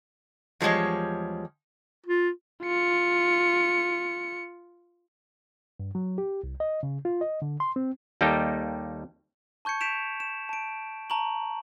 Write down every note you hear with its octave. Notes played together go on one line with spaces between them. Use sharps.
E2 F3 G3 G#3 C#5
F4
F4 C#7
G2
F#3
G4
C2
D#5
C#3
F4
D#5
D3
C6
C4
D#2 G3 A#3 D#4 G4 A4
A5 C#6 G6 G#6 C#7
G6 B6 D7 E7 F7
E7
A5 D7
A5 A#5 C#6 F#7